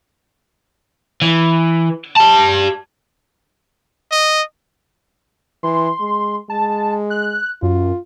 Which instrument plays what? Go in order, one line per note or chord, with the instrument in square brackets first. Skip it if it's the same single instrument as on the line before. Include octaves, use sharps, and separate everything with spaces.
[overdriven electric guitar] E3
G4 A5
[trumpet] D#5
[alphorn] E3 [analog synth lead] C6
[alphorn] G#3
[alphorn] G#3 [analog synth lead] A5
[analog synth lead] F#6
[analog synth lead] F#2 [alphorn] F4